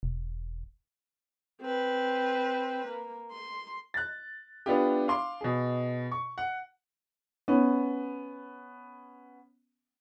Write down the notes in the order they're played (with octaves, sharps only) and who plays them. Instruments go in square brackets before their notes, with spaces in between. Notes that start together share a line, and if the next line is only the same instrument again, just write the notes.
[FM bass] E1
[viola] C4 B4
A#3
C6
[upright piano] F#6 A6
B3 D4 E4 F4 G4
F5 C6 D6
B2 G#4
C#6
F#5
B3 C#4